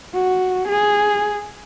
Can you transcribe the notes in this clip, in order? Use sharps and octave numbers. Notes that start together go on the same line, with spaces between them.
F#4
G#4